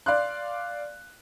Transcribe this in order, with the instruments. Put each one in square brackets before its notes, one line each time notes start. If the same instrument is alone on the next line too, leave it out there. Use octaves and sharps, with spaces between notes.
[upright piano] D5 F5 C6 F#6